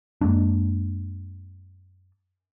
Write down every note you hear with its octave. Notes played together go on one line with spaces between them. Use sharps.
F#2 G#3 A#3 D4